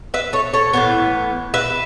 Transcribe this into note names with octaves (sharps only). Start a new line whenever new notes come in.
B4 E5
A4 C#5
A4 C#5
A2 E3 B3
B4 E5